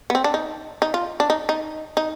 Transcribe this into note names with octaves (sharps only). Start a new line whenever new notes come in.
B3
C4
D4
D#4
D#4
F4
D4
D#4
D#4
D#4